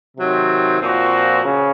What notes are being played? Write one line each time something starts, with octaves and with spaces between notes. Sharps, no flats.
C3 D#3 F#3 C4
A#2 F3 C4 F#4
C#3